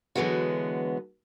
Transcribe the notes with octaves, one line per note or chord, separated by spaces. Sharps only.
D3 E3 F#3 G#3 B3 F#4